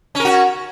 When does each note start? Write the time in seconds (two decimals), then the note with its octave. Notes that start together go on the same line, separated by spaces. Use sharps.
0.15 C#4
0.20 A#4
0.25 F#4